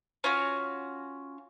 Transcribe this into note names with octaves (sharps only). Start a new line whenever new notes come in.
C#4 F4 F#4